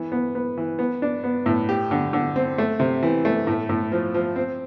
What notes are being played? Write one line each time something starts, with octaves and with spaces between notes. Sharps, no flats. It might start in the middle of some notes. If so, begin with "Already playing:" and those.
Already playing: E3 B3
B3
B3
E3
B3
D4
B3
A2
G4
D3
D3
C4
A3
C3
E3
A3
A2
A2
F3
F3
C4